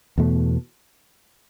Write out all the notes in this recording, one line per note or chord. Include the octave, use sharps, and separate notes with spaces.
E2 B2 A3